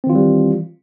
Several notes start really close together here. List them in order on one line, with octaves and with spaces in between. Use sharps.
C4 D#3 F4 E3 G3